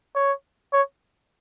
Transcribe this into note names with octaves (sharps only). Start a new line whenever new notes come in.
C#5
C#5